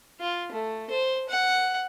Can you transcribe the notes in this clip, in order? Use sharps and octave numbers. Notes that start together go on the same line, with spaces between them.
F4
A3
C5
F#5